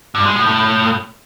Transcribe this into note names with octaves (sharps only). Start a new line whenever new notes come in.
G2
G#3
A2
A2